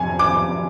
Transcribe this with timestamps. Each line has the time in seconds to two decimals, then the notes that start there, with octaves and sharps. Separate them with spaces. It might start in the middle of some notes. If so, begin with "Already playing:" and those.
Already playing: F2 C3 F3 G#5
0.19 D6